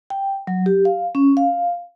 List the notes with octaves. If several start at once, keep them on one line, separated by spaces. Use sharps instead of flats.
G5
F#3
G4
F5
C#4
F5